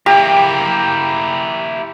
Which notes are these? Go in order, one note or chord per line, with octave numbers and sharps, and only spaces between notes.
A#3 E4 G4